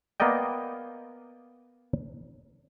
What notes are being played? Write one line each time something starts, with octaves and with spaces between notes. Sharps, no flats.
A#3 B3 A#4 D5 D#5 G5